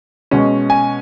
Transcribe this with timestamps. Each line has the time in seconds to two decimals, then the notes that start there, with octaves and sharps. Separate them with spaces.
0.31 B2 G#3 C#4
0.70 G#5